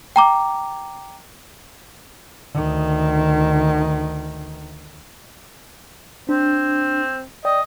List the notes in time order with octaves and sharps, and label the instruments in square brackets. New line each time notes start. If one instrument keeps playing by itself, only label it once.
[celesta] G5 A#5 D6
[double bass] D2 D#3
[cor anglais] C4 [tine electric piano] D4
[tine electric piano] D5 G5 [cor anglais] D#5